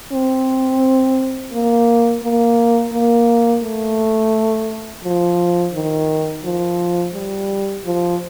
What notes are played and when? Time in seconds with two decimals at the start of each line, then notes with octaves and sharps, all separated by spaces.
0.12 C4
1.52 A#3
2.22 A#3
2.93 A#3
3.63 A3
5.04 F3
5.73 D#3
6.44 F3
7.14 G3
7.85 F3